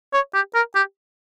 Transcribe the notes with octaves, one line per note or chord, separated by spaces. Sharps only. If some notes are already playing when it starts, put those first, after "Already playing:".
C#5
G4
A#4
G4